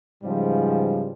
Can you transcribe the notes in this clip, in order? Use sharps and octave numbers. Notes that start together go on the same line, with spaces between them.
G#2 C#3 E3 F3 G3